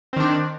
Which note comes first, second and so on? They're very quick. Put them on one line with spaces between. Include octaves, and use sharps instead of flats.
C4 D#3 D4